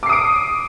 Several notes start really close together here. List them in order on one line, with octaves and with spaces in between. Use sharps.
D6 C7 D#6 D7